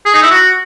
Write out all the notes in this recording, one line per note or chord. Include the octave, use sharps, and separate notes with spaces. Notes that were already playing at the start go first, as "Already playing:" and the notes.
G#4
D#4
E4
F#4